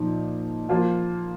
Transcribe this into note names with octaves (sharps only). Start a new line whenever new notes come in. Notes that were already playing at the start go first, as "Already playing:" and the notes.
Already playing: A#2 F3 D#4
F3 A#3 F4